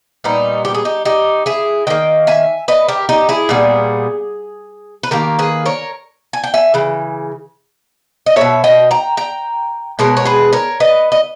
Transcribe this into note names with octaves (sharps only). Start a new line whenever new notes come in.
A#2 G3 B3 D#4
G4
G#4
D#4 G4
D#4 G4
E4 G#4
D#3 A#3 D#5 G5
E5 G#5
B4 D#5
G4 A#4
D#4 G4
E4 G#4
A#2 G3 B3
B4
D#3 A#3 G4 A#4
G#4 B4
A#4 C#5
G#5
G5
E5 G#5
C#3 E3
D#5
B2 A#3 C#5 E5
D#5 G5
G5 A#5
G5 A#5
B2 G#3 B3 A#4 C#5
C#5
G#4 B4
A#4 C#5
B4 D#5
D#5